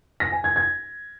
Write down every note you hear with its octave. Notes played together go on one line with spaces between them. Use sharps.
A#6
G#5
G#6
G#6